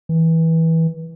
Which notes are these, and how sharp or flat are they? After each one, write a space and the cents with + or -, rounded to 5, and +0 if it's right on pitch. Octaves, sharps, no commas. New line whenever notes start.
E3 -20